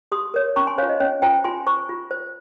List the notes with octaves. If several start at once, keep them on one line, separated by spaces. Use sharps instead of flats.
G4 C6 D#6
A#4 C#5
C#4 A#5 C#6
G#5 C6
F4 C5 C#5 F5
D#5
C#4 C#5
F4 C5 G5 A#5
F4 G#5 C6
C5 A#5 C#6
F4
C5